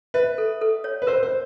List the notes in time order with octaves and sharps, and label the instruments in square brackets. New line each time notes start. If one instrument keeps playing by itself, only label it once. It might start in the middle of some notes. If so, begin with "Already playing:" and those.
[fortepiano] B4 [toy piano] E5
[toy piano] A4
A4
C#5
[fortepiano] B4
[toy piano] A#4 [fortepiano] C5
[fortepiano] C5